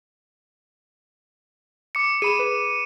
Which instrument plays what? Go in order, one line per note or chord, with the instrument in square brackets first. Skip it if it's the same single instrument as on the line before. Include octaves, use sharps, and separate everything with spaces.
[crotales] D6 C#7
[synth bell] G#4 B5 E7 [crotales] D#7
[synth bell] B4